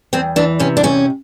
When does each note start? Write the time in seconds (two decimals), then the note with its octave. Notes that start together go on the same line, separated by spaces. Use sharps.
0.13 E2 C4
0.36 E3 D4
0.60 C3 C#4
0.77 D4
0.83 E2 C#4